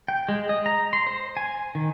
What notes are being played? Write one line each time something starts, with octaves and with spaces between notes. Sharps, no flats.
G5
G#3
D#5
A#5
C6
C5
G#5
D#3